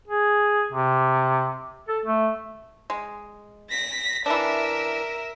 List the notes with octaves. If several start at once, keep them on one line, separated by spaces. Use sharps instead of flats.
G#4
C3
A4
A3
G#3
A#6 B6
E3 D4 A#4 E5